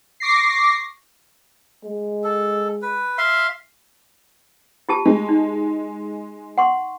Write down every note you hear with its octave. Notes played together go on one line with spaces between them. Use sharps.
C#6 D6 A#6 C7
G#3
A4
B4
E5 F5 C6
F4 G4 A5
G#3
D#4
F#5 C6 C#6